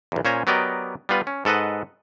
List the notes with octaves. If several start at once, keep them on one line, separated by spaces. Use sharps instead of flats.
B1 E2
A#2 C#4 C5 G#5 A#5
F#3 B3 G4 A#4 D5 D#5
G3 B3 F4 B4
C#4
G#2 A4 B4 D#5 F#5